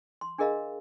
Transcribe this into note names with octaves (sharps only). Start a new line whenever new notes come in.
C6
D4 G#4 A#4 D#5 F5 A#5